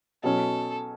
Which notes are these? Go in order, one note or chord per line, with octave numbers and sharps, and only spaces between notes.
B2 F#3 C#4 A4